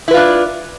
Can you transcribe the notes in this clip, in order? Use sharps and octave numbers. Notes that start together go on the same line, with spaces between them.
D4 E4 F4 B4